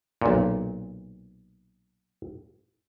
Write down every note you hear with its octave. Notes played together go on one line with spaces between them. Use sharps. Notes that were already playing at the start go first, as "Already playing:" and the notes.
B1 A#2